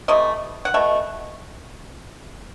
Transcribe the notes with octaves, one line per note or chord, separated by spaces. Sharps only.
C3 E3 A3 D#5
F#5
B2 A3 E5